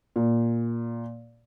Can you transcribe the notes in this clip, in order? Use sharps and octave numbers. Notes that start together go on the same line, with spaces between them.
A#2